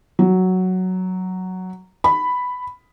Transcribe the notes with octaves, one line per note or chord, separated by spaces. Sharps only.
F#3
B5